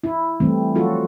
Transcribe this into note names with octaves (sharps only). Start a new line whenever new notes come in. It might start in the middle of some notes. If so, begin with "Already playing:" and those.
E4
E3 G3 A3 C4
F3 F#3 F4 F#4 A4